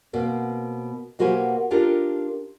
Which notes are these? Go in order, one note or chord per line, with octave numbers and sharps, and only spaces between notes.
B2 A#3 C4
B2 A#3 F#4 G4 C5 G#5
D4 F4 G4 A4 A#4